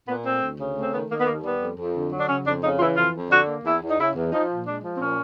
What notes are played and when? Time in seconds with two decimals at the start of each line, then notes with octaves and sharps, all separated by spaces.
0.08 A#2 B3
0.26 A3 C4
0.43 D2
0.60 C#3
0.77 A3 C4
0.94 D#3 B3
1.11 D#3 A#3
1.20 B3
1.27 D#2 A#3
1.44 G3 B3
1.61 F2
1.78 F2
1.95 D3
2.12 F#3
2.20 D4
2.29 C#3 C#4
2.46 F2 D4
2.63 C#3 D#4
2.75 F4
2.80 E3 E4
2.97 F2 F4
3.14 F2
3.31 D3 F#4
3.48 A#3
3.65 E2 E4
3.82 E2
3.90 D#4
3.99 C#3 E4
4.16 E2
4.32 F3 D#4
4.49 A#2
4.66 G#3 D4
4.84 F3
4.96 C4
5.00 A#2 C#4